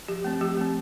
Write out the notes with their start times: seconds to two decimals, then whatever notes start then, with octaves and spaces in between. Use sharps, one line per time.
0.08 F3 G4
0.24 A3 C4
0.41 F3 G4
0.57 A3 C4